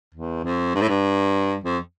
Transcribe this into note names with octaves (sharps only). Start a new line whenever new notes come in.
E2
F2
G2
A2
G2
F2